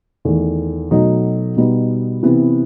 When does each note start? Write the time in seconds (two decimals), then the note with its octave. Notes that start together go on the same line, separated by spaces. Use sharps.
0.25 E2 D#3 A3
0.91 B2 F#3 A3 D#4
1.56 B2 G3 B3 D#4
2.23 C3 E3 B3 E4